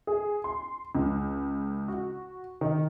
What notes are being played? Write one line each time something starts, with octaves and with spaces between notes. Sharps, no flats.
G#4
C6
C#2
F#4
D#3